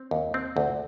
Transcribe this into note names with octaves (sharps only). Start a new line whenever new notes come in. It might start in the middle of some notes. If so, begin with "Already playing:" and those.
Already playing: C4
D#2
C4
D2